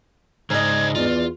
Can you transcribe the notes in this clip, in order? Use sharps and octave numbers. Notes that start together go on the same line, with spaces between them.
G#2 C#3 C5 D5 D#5 G#6
E2 F4 D5